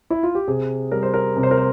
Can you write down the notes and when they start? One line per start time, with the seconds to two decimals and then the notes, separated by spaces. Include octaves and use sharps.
0.10 E4
0.23 F4
0.35 G4
0.48 C3 G#4
0.92 G3 A#4
1.03 C5
1.14 A#4
1.36 C3
1.43 C5
1.51 A#4
1.57 C5